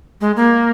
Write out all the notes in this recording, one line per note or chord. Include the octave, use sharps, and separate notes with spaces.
G#3
A#3